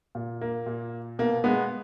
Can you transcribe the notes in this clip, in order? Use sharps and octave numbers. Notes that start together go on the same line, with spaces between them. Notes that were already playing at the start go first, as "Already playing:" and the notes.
A#2
A#3
A#2
B2 A#3
G#3 B3